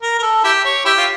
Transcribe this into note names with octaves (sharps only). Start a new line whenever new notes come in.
A#4
A#4
A4
E4 G4
C#5
E4 G4
F4